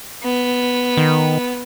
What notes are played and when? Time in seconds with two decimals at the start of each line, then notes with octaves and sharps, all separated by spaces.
0.23 B3
0.97 D#3